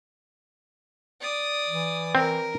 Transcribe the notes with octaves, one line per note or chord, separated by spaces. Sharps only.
D5 D#6
E3
C4 A#4